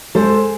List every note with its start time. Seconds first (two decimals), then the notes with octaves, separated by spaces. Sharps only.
0.15 G#3 A4 C5